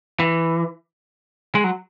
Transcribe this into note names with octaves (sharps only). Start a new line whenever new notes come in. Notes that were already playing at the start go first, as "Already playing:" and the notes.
E3
G#3
F#3